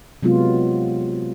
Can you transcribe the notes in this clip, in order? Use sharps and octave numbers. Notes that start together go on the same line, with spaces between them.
C3 F#3 G#3 B3 F4